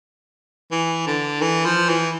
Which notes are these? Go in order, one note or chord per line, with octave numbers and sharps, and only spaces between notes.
E3
D3
E3
F3
E3